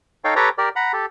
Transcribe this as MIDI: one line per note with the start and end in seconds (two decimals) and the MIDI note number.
0.24 0.34 63
0.24 0.34 69
0.24 0.34 73
0.24 0.34 77
0.24 0.34 79
0.36 0.49 67
0.36 0.49 69
0.36 0.49 71
0.36 0.49 73
0.36 0.49 79
0.36 0.49 82
0.58 0.69 67
0.58 0.69 70
0.58 0.69 74
0.76 0.92 78
0.76 0.92 82
0.76 0.92 83
0.93 1.06 67
0.93 1.06 69